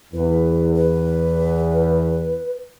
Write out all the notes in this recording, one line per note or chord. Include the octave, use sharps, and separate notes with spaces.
E2 B4
B4